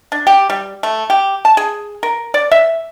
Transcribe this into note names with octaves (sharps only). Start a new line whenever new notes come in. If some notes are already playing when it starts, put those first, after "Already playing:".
D4
G4
G3
A3
G4
A5
G#4
A#4
D5
E5